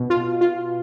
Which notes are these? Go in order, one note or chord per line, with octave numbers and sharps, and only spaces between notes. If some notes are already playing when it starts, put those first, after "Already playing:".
Already playing: B2
F4
F4